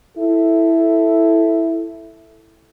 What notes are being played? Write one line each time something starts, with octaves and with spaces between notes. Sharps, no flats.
E4 A4